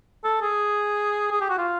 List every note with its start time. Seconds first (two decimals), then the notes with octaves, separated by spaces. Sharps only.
0.24 A4
0.42 G#4
1.32 G#4
1.41 G4
1.50 F#4
1.58 F4